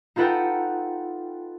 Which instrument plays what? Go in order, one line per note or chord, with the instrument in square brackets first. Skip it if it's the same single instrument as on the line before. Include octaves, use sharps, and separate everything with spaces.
[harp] D#4 F4 A4 B4 F#5 G5